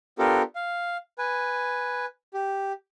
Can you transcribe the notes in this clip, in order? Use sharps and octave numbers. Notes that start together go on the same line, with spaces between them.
B3 D4 F4 G4 A4 A#4
F5
B4 G#5
G4